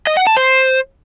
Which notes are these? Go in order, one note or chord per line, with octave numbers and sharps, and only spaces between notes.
D#5
F#5
A5
C5